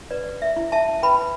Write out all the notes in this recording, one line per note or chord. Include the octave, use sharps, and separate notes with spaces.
B4 D5
E5
E4
E5 A5
B4 G5 B5